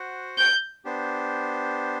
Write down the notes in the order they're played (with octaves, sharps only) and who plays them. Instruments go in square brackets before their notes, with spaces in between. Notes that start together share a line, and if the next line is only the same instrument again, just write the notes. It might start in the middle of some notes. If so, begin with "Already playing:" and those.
Already playing: [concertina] F#4 C5 F#5
[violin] G6
[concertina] B3 D4 G4 C5